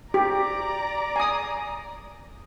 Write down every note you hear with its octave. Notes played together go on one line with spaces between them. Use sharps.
G4 D5 A#5
G#5 D#6